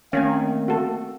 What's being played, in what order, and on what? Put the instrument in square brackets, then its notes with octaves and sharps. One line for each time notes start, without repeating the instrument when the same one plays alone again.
[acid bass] D#3 [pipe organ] A3 A#3 C4 [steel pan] C#4 F5 G#5
[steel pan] F#4 A4